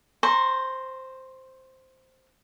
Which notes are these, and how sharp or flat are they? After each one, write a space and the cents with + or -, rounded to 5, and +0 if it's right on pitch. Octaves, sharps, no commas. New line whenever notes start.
C5 +0 A#5 -10 C#6 -40